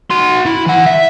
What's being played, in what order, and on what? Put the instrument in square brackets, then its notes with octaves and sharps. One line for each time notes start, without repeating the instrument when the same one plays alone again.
[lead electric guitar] F#4 C6
E4
E3 F#5
E5